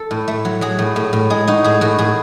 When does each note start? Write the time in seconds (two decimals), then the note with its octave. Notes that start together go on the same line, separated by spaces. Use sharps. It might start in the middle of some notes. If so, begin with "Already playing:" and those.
Already playing: A4
0.11 A2
0.28 A3
0.45 F#3
0.61 F#3 G#4
0.79 A2
0.96 A2
1.13 A2
1.30 G#3 G#4
1.47 D#4 F#4
1.64 A2 G#4
1.81 A2 F#4
1.98 A2 G#4